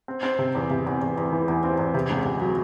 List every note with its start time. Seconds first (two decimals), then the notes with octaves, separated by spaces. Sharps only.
0.08 C4
0.23 C4
0.39 C3
0.55 E2
0.70 C3
0.86 E2
1.01 E2
1.17 E2
1.32 E3
1.48 E2
1.64 C4
1.79 E2
1.94 C3
2.10 C#2
2.25 C3
2.41 F#3